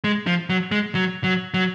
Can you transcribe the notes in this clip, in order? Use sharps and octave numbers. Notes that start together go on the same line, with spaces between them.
G#3
F3
F#3
G#3
F#3
F#3
F#3